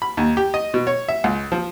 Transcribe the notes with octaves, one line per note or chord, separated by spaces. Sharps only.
B5
D#2
G4
D#5
B2
C#5
E5
C#2
F3